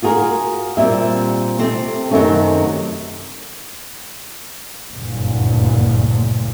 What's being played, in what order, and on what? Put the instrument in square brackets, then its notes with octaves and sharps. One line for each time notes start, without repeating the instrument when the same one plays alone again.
[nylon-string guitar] F4 F#4 G#4 A#4
A#2 G3 C4 E5
C3 A3 C4
F#2 C3 D#3 A3 C#4
[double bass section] F#1 D2 G2 A#2